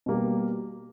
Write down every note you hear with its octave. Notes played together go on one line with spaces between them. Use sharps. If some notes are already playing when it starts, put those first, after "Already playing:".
B2 G3 A#3